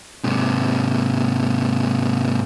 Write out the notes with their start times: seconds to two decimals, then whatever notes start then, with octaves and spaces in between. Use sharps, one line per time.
0.24 G#2 C3